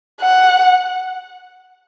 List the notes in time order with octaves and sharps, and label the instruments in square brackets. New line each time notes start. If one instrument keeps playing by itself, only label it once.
[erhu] F#5